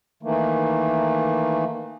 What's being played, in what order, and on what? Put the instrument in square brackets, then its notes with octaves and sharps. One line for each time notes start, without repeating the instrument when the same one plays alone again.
[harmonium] D#3 E3 A3 A#3